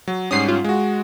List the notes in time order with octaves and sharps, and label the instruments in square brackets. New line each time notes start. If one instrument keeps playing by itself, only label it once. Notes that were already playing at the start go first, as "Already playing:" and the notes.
[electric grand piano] F#3
[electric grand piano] G#2 G3 C#4 [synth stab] D#6 C7
[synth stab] F4
[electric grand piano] G#3 F#4